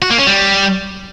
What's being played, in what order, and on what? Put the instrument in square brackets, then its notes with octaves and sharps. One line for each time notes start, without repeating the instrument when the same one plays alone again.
[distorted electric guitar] F#4
A#3
C#4
G3